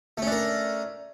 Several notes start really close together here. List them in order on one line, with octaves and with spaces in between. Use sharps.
A3 C#4 D4 A#4